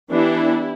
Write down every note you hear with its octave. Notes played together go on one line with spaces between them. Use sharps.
E3 B3 D4 E4 G4